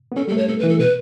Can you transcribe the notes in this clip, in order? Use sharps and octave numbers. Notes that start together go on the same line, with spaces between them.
B3
C#4 A4
G3 A3 A4
C#5
B3 A4
B4
E3
A4
B2 B4